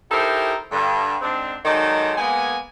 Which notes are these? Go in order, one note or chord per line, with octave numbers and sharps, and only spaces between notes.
D#4 E4 G4 A4 A#4 C5
G2 D3
G#2 C4 D4
D#3 F#3 G#3 D#4 A4 D5
G#3 A#3 B3 G#5